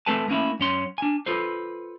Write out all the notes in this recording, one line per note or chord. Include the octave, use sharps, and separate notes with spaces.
A3 C4 A4 B4 G#5 A5
A3 A#3 C#4 E4
F#2 C#4 C6
D4 G#5
F4 A4 B4 C5